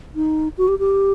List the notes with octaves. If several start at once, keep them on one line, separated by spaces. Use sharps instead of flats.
D#4
F#4
G4
G4